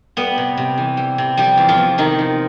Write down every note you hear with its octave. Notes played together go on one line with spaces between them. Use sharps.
G3 B3 B4
C3
C3
E3
G3
C3
F3 G3 G4
E2
F3 F4
E2
C3 D#3 D#4
F3